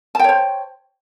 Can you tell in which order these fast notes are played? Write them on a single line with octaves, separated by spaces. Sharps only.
A5 G5 C#5 C5